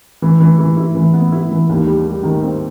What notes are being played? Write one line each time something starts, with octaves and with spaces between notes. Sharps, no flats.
E3
E3
E3
E4
E3
B3
E4
E3
D#2
G3
G3
D#3
C4